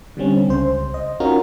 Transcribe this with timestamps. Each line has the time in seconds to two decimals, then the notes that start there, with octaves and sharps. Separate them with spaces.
0.17 D3 G3 C4 C#4
0.48 C#2 C5
0.94 D#5
1.20 C#4 D#4 F4 F#4 A#4